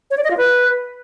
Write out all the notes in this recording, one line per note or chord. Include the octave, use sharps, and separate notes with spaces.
C#5
D5
D#5
F4
B4